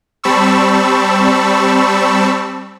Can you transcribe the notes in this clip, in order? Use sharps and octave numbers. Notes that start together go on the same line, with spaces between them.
G3 C4 A5 B5 C#6 E6